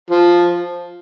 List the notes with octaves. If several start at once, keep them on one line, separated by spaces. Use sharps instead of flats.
F3